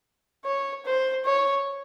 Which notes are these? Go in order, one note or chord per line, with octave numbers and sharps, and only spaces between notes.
C#5
C5
C#5